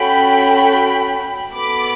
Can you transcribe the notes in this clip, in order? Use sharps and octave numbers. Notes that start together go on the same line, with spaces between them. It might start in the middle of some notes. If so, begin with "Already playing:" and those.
Already playing: C#4 F#4 A4 G5 B5
B3 F#4 A4 B5 D6